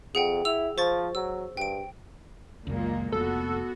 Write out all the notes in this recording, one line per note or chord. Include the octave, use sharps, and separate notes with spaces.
F2 G#4 F#5 G5
E4 E6 F7
F3 C5 C#6 A6
F#3 E6
G2 G5 D7
C#2 F#2 A#2 G#3 A#3
F1 B3 F#4 A4